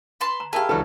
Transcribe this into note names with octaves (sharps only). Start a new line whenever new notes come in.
B4 A5 C6
A#5
E4 G4 G#4 A#4 F5 G5 A5
C#2 E3 F#3 D4 A4 B4